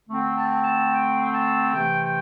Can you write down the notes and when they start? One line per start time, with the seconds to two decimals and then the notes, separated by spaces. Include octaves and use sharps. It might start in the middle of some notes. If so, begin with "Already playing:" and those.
0.08 D3 A3 C4
0.36 A5
0.64 A5
0.92 G5
1.22 G5
1.33 A5
1.74 C3 E3 A3 G5
2.02 G5